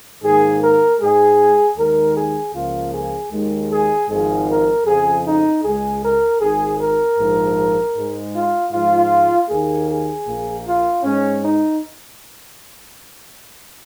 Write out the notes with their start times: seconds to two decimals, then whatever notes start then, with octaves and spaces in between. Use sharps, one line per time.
0.23 G#2 D#3 A#3 G#4
0.62 A#4
1.00 G#2 G#3 G#4
1.77 D#2 D#3 G#3 A#4
2.16 G#4
2.54 C#2 C#3 F3 A#3 F4
2.93 G#4
3.31 D#2 D#3 G#3
3.70 G#4
4.08 G#1 G#2 F3 G#3 G#4
4.47 A#4
4.85 F2 C#3 F3 G#4
5.24 D#4
5.63 C#2 C#3 G#3 G#4
6.02 A#4
6.40 G#1 G#2 D#3 G#4
6.78 A#4
7.18 A#1 G#2 F3
7.95 G#2 G#3
8.33 F4
8.71 G#2 F3 G#3 F4
9.49 D#2 D#3 A#3 G#4
9.88 G#4
10.26 A#1 A#2 A#3
10.65 F4
11.03 G#2 G#3 C#4
11.42 D#4